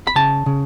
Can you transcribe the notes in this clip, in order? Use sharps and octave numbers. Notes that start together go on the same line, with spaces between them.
B5
C#3 A5
C#3